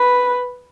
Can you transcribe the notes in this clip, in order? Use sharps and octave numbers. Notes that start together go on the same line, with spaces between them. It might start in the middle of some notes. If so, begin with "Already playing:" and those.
Already playing: B4